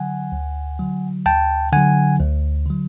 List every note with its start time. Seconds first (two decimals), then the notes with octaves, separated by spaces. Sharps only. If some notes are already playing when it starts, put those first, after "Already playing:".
Already playing: D3 F#3 F#5 G#5
0.32 D2
0.79 D3 F#3
1.26 D2 G5 A5
1.73 D3 F#3 F#5 G#5
2.19 D2
2.66 D3 F#3